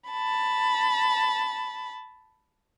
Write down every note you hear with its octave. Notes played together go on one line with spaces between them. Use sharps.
A5 B5